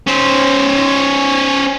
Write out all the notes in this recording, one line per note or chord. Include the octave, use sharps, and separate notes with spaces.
C#4 C5